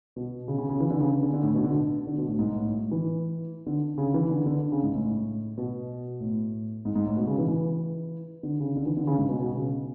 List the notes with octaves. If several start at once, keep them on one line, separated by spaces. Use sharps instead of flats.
B2
C#3
C#3
C#3
E3
D3
C#3
C#3
D3
D3
A2
B2
D3
D3
B2
A2
G#2
A2
A2
E3
D3
C#3
E3
D3
D3
C#3
G#2
A2
B2
A2
G#2
G#2
A2
B2
C#3
E3
E3
D3
C#3
D3
E3
D3
C#3
G#2
B2
B2
C#3